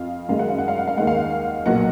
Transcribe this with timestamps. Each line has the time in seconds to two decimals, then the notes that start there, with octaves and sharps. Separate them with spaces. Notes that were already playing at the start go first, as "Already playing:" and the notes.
Already playing: F2 F5
0.28 F#2 D#3 G#3 F5
0.39 F#5
0.49 F5
0.58 F#5
0.68 F5
0.78 F#5
0.87 F5
0.97 D#2 D#3 G#3 F#5
1.07 F5
1.66 B1 A#2 F#3 A#3 F#5